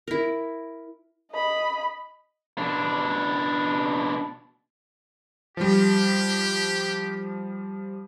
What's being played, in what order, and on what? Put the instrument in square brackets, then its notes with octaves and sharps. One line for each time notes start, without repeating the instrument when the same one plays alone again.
[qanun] E4 A#4
[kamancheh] D#5 B5
[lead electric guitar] B2 D4
[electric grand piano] F3 G3 [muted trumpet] G4